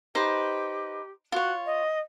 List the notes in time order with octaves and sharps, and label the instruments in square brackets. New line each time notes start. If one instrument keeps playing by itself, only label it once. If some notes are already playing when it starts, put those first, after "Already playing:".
[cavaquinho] D#4 B4 C5 [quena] G4
[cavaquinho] F4 C#5 [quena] F#4
[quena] D#5